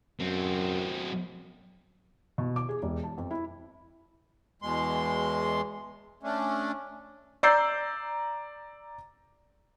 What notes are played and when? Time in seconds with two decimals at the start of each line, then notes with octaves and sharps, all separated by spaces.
0.19 F#2 F#3 C4
2.38 B2
2.56 D6
2.69 G#4
2.83 E1
3.03 A5
3.18 F2
3.31 E4
4.62 E2 B2 G#3 C6
6.23 A3 C#4 D4
7.43 D5 A#5 E6 G6 C7